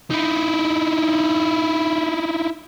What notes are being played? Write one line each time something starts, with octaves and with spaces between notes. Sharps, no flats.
D#4 E4